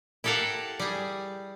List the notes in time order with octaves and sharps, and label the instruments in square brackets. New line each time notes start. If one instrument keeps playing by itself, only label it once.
[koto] E4 G4 A4 A#4 F5 F#5
G3 G#4